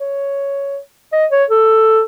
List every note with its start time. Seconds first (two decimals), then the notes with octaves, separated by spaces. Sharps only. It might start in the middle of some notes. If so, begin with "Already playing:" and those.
0.01 C#5
1.12 D#5
1.32 C#5
1.50 A4